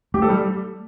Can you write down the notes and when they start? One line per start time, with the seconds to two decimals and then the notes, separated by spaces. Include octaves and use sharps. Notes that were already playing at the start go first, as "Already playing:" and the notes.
0.14 A3 G4
0.22 A4
0.29 G3 G4